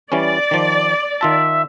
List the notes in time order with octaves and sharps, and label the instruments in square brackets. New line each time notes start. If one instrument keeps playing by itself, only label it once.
[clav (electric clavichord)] E3 G3 C#4 [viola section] D5
[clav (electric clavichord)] D#3 F3
[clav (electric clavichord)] D#3 F4 A5 [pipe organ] E5